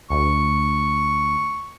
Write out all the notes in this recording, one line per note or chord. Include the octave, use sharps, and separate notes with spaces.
D2 C#6